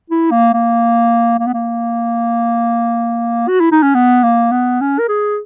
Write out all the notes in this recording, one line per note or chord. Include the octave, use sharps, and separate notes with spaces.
E4
A#3
A#3
A#3
B3
A#3
F#4
E4
D#4
C#4
B3
A#3
B3
C#4
A#4
G#4